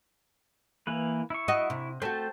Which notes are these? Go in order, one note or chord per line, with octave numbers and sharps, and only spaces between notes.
E3 A#3 B4
E4 C#6
F#4 D#5
C3
A3 F#4 C5 G5 A5